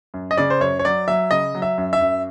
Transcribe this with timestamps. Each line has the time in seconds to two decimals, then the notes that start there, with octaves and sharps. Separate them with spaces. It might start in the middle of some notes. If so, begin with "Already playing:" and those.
0.14 F#2
0.31 D#5
0.37 C#3 D5
0.50 C5
0.60 F#2 C#5
0.79 C#5
0.85 F#3 D5
1.08 F#3 E5
1.31 C#3 D#5
1.55 F#3
1.62 E5
1.78 F#2
1.93 E5
2.01 F#2